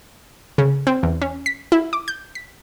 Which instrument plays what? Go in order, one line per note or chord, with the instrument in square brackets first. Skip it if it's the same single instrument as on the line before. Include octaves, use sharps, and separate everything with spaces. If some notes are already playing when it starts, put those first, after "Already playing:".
[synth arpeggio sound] C#3
C4
E2
C#4
B6
E4
D6
G6
B6